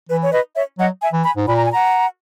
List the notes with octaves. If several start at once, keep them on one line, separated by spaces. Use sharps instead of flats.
E3 B4
C#5
B4 D#5
C#5 E5
F#3 D#5 F#5
E5 G#5
E3
G#5 B5
G#2
A#2 B5
A#5
G#5
F#5 A#5